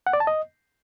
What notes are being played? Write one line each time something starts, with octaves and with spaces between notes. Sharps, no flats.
F#5
D5
A5
D#5